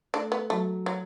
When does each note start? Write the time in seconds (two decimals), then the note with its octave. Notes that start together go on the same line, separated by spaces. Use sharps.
0.14 A3 D4
0.32 B3
0.50 F#3 A3
0.86 F#3